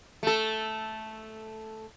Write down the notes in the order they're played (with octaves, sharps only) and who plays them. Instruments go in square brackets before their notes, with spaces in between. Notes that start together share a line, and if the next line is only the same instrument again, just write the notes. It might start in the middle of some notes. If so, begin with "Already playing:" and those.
[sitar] A3 A4